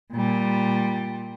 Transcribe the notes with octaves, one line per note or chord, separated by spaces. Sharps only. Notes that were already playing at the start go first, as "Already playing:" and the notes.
A#2 G3